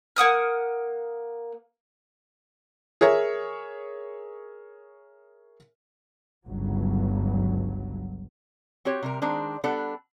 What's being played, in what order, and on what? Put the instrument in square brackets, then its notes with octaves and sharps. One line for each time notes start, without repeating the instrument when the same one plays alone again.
[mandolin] A#3 F#5 D#6 F6
[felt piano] G#4 A#4 C#5 E5
[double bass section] G1 C#2 F#3
[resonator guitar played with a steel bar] C4 F#4 G4 C#5
C3 G3 A#4
D#3 G#3 C4 D4
G3 B3 D4 A4 F#5